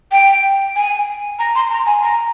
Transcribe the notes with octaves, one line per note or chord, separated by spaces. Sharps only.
G5
G#5
A#5
C6
A#5
G#5
A#5